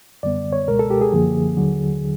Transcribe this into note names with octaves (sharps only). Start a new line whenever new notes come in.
F#2 D3 G3 B3 D5
C#5
C#2 B2 G#3 A#4
A4
G4
G#4
F#2 D3 F3 A#3
D#2 D3 F#3